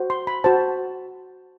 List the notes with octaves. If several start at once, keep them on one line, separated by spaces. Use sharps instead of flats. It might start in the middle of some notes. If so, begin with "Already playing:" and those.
Already playing: F#4 C5
C6
B5
F#4 C5 A5